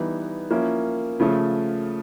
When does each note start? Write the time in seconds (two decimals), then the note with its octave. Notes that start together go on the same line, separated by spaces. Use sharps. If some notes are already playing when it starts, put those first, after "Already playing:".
Already playing: E3 G3 B3 D#4
0.50 F3 A#3 C#4 E4
1.20 C#3 F3 A3